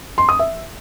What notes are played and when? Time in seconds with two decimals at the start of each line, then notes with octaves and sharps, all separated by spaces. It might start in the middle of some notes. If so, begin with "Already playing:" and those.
0.18 C6
0.29 D#6
0.39 E5